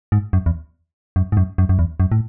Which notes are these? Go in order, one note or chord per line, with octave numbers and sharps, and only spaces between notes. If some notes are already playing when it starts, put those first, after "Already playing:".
G#2
F#2
E2
F#2
G#2
F#2
F#2
F#2
E2
F#2
A2